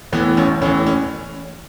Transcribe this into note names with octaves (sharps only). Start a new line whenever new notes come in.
A2 E3 B3
A1 C#4
A2 E3 C#4
C#4